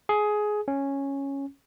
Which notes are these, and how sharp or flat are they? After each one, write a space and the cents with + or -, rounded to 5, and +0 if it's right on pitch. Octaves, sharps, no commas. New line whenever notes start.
G#4 +15
C#4 -5